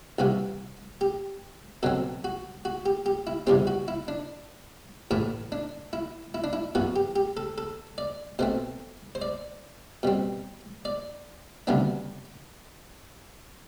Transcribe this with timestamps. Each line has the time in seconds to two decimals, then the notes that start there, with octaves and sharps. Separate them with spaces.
0.19 C2 C3 E3 F#4
1.01 G4
1.83 B2 F#3 C4 A4
2.24 F#4
2.65 F#4
2.86 G4
3.06 G4
3.27 E4
3.47 E2 C3 G3 C4 G4
3.67 F#4
3.88 E4
4.08 D4
5.11 A1 A2 E3 A3 E4
5.52 D4
5.93 E4
6.34 E4
6.44 D4
6.53 E4
6.75 F#2 E3 B3 F#4
6.96 G4
7.16 G4
7.37 A4
7.58 A4
7.98 D5
8.39 B2 A3 C4 C5
9.15 C5
9.22 D5
10.03 B2 G3 C4
10.85 D5
11.67 D2 C3 G3 B3 D4